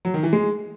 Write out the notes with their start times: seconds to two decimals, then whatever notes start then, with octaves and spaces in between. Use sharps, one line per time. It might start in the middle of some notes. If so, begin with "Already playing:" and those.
0.05 F#3
0.14 D#3
0.23 E3
0.33 G#3